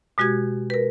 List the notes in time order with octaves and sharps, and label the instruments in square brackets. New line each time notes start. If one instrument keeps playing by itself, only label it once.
[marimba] B2 G#3 F#4 G4 G#6
A#4 B4